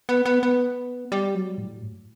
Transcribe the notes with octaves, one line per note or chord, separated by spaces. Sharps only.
B3
B3
B3
G3
F#3
A2
G2